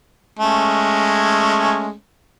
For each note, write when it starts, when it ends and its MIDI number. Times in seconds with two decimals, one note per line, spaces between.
0.39 1.93 56
0.39 1.93 57
0.39 1.93 61